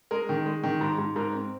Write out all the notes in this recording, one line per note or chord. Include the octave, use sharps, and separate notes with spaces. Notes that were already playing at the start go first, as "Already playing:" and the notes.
G#3 A#4
D#3
G#3
D#3
G#2
G#2
G#2 A#4
C4